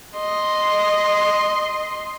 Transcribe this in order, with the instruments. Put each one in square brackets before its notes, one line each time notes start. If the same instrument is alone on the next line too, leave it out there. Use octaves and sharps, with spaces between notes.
[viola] D#5 C6